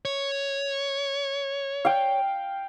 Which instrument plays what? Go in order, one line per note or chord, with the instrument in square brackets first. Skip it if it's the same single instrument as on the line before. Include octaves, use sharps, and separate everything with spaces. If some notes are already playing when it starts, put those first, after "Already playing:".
[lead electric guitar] C#5
[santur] F5 G5